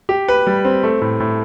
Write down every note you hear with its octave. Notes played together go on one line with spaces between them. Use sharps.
G4
B4
G3
C4
A3
A2
A2